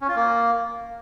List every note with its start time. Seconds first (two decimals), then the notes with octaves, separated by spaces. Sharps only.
0.01 C#4
0.08 F4
0.16 A#3